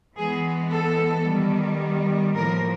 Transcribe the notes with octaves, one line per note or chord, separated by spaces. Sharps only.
E3 G#3 B3 G#4
A4
D#3 G3 B3
A2 F3 A#3 A#4